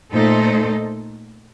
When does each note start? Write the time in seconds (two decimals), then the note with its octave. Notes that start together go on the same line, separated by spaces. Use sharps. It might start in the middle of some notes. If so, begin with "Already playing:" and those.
0.12 A#2 A3 D#4 A4 C5